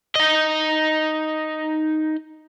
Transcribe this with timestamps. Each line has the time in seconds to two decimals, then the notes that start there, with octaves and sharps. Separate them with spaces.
0.15 D#4 D#5